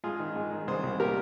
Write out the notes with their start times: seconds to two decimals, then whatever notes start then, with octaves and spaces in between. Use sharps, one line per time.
0.04 G#2 F4 G#4
0.19 D#3
0.36 G#2
0.52 D#3
0.68 C2 G#4 C5
0.83 C2
1.00 A#2 G4 A#4